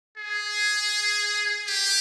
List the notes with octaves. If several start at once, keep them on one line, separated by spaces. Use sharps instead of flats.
G#4
G4